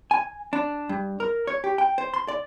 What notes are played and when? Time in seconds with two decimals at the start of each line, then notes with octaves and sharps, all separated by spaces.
0.11 G#5
0.53 D4
0.89 G2
1.20 A#4
1.47 C#5
1.64 G4
1.78 G5
1.98 C5
2.14 C6
2.28 D5